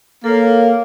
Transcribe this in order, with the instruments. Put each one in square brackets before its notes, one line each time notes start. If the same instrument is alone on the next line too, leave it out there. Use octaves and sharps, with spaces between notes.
[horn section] A#3 [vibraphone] A4 C#5